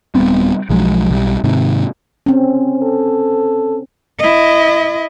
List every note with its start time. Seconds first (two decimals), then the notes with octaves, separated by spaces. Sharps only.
0.15 D#1 G3 B3 C4
0.69 B1 F3 F#3 G#3
1.10 B1 F3 G3
1.44 G#2 C3 D#3
2.26 C4 C#4
2.83 A4
4.19 E4 D#5